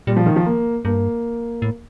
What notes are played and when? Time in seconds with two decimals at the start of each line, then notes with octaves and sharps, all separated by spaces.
0.07 A#2 G3
0.16 F3
0.26 D#3
0.36 F3
0.46 A#3
0.85 G2 A#3
1.62 A2